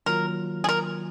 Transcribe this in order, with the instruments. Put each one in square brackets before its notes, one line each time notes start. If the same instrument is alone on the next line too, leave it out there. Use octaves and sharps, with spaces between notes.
[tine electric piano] D#3 F#3 A#3 F4 [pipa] A#4
[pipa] G#4
A#4